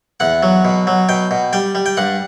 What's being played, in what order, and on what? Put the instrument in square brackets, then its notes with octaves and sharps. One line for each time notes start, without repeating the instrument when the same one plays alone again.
[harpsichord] E2 F#5
F#3
B2
F#3
B2 G5
B2
G3 G5
G3
G5
G2 F#5